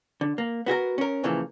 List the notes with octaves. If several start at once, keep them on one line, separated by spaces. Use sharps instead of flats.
D3
A#3
B3 F#4 G#4 A#4
C#4 A#4
A#2 C#3 E3 F3 A#3 A4